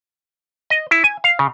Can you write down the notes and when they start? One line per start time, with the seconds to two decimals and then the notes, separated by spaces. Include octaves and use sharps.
0.70 D#5
0.91 E4
1.04 G#5
1.24 F5
1.39 C#3